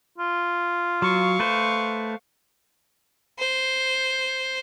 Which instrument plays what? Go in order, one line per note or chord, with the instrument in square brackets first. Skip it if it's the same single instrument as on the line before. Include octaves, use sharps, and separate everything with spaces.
[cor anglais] F4
[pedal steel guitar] F#3 [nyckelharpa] F5 C#6
[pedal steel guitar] A3 B4 C5
[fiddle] C5